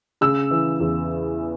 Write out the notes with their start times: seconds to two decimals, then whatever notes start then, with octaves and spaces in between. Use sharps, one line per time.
0.21 C#3 E6
0.51 E3
0.80 E2